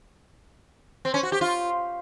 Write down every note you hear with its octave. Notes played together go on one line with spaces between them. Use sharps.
C4
C#4
F#4
G4
F4